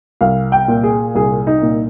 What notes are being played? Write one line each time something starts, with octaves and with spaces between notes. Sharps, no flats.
C2 F5
G5
A#2
G#4
C2 G#4
D#4
A#2